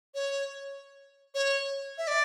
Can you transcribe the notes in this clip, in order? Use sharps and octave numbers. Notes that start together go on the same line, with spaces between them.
C#5
C#5
E5
D5